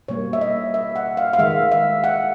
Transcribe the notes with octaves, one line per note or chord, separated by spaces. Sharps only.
B2 G3 A#3 C#5
E5
D#5
E5
F#5
F5
F5
D#3 G#3 E5
E5
F#5